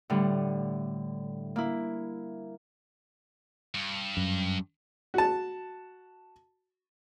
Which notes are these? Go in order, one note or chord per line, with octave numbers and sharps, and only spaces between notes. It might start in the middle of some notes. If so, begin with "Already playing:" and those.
A2 D3 G3
A#3 E4
G2
F#2
F#4 A5